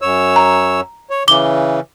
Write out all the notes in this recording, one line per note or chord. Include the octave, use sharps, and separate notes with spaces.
F#2 C#5 E6
A#5
C#5
C#3 E3 D6 G7